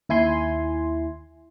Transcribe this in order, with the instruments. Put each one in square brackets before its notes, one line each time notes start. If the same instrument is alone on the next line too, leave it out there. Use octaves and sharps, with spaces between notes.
[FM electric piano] D#2 E4 G#5 C6